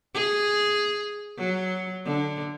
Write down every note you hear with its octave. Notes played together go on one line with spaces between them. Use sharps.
G#4
F#3
D3